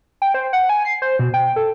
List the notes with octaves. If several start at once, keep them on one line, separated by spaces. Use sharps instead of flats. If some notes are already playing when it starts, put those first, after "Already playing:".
G5
C5
F#5
G#5
C7
C5
B2
G5
A4